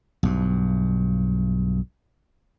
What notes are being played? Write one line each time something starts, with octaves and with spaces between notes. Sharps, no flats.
B1 G2